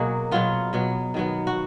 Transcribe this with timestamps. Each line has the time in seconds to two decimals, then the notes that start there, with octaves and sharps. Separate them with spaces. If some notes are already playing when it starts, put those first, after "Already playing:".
Already playing: B2 F#3 A#3 F#4 G#4
0.31 B2 F#3 B3 F4
0.73 B2 F#3 B3
1.14 D#3 F#3 B3
1.47 F#4